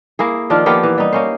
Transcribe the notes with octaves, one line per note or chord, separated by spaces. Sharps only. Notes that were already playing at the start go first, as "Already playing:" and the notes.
A#3 E4 G#4
D#3 F3 D4 F4
F3 A#3 B3 G4
E3
G3 D#4
A#3 C#4 C5